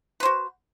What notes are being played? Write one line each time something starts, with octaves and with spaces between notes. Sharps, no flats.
F#4 B4 C5